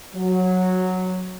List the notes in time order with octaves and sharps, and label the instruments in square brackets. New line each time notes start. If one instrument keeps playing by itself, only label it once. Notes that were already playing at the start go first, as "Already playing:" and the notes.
[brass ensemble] F#3